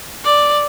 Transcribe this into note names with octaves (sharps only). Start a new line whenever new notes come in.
D5